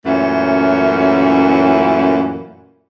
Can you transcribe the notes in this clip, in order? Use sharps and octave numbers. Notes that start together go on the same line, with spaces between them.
F#2 A#2 E3 A3 C#4